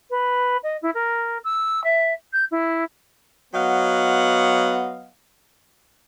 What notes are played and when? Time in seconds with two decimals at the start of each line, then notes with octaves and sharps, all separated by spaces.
0.10 B4
0.63 D#5
0.82 E4
0.94 A#4
1.44 E6
1.84 E5
2.33 G6
2.51 E4
3.53 F#3 B3 D#5 F5 F#5